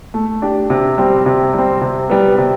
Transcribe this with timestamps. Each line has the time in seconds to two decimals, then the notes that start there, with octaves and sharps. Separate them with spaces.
0.14 A3
0.42 D4 G4
0.70 C3
0.98 G3 C4
1.26 C3
1.54 G3 C4
1.81 C3
2.09 G3 B3
2.38 C3